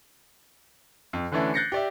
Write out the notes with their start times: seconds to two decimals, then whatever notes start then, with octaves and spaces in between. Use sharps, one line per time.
1.13 F2
1.32 D3 E3 A3 C#4 D4 E4
1.54 F#6 G6 A6 A#6 C7 C#7
1.72 G4 D5 E5